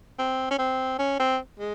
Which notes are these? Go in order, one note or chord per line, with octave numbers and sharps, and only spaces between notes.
C4
C#4
C4
C#4
C4
G#3